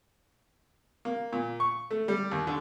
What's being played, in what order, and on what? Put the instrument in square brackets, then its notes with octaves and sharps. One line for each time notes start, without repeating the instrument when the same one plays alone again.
[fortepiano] A#3
A#2
C#6
A3
G3
D#2
D3